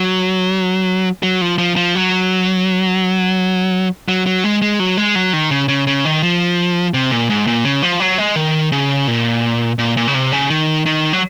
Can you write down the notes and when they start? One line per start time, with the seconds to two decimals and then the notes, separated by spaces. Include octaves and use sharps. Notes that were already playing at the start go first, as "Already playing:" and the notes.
Already playing: F#3
1.23 F#3
1.41 F3
1.58 F3
1.76 F3
1.95 F#3
4.08 F#3
4.26 F#3
4.44 G#3
4.62 G#3
4.80 F#3
4.97 G#3
5.15 F#3
5.33 D#3
5.51 C#3
5.68 C#3
5.87 C#3
6.05 D#3
6.23 F3
6.94 C3
7.11 A#2
7.30 G#2
7.47 A#2
7.65 C#3
7.83 F3
8.00 F#3
8.18 G#3
8.36 D#3
8.72 C#3
9.08 A#2
9.79 A#2
9.97 A#2
10.08 C#3
10.15 C3
10.32 C#3
10.50 D#3
10.86 D#3
11.13 F#3